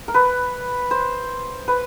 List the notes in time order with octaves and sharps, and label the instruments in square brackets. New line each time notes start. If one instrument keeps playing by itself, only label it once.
[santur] A#4
B4
C5
B4